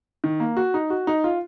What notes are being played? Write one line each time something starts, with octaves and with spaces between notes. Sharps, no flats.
D#3
A#3
F#4
D#4
F#4
D#4
F4